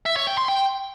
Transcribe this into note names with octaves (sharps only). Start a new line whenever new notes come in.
E5
C#5
G5
C6
G5